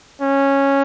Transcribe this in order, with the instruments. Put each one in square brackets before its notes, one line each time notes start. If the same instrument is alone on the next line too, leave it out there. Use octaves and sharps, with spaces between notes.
[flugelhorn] C#4